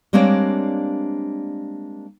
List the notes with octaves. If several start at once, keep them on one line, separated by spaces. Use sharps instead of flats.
G3 G#3 A#3 C4 D4 C#5